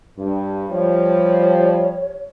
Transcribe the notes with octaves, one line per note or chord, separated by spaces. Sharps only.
G2
F3 G3 C#5